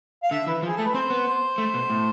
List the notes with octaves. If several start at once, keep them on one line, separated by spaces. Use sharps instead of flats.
F5
D3 E5
E3 B4
F3
G#4
A3 A4
B4
C4 C5
B3
C5
A3
B2
A2